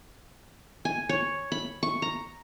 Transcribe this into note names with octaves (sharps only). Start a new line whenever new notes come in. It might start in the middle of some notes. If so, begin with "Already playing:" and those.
G#5
C#5
B5
C#6
A#5